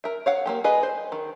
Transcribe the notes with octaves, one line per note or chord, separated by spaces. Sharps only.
A#4 E5
C#5 F5 F#5
A#3 C4 G4
G#4 B4 D#5
C5
D#3